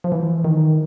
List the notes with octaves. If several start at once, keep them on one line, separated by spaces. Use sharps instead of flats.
F3
E3
D#3